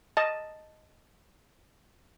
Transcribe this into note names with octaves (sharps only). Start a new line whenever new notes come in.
D#5 A5